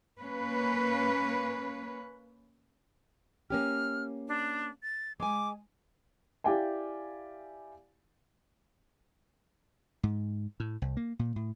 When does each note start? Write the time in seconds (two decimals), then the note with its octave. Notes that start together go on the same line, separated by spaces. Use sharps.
0.20 A#3 C#4 B4
3.50 A#3 C#4 G4 F6
4.28 D4
4.83 A6
5.20 G#3 G#5 D6
6.44 E4 G4 D5 F5 G5 G#5
10.03 G#2
10.60 A2
10.82 C2
10.97 A#3
11.19 A#2
11.36 A2